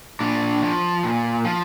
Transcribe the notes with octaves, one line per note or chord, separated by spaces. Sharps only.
A#2 D4
F3
A#2
F3